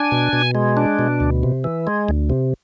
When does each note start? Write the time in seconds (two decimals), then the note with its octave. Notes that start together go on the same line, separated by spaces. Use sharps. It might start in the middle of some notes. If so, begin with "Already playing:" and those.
Already playing: D4 G#5
0.12 B2
0.33 B2
0.55 G#3
0.77 D4
0.99 B2
1.20 D2
1.43 C3
1.64 E3
1.87 G#3
2.09 D2
2.30 C3